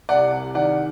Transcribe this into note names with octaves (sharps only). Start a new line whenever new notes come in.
C2 D5 F#5
C2
D#3 D5 F#5